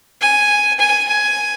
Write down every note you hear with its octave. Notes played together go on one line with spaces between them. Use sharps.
G#5
G#5
G#5